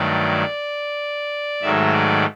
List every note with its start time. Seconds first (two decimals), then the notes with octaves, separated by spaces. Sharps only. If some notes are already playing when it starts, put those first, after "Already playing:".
Already playing: G2 D#3 F#3 A3 D5
1.62 G#2 D#3 F#3 A3 E5
1.92 D5